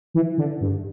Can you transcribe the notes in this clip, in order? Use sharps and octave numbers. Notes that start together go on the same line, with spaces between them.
E3
D3
G2